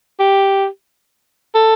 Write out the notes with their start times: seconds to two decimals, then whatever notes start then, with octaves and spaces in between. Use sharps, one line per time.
0.20 G4
1.55 A4